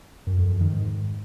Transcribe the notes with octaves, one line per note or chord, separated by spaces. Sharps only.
F#2
F2
F#2
D#3
G#2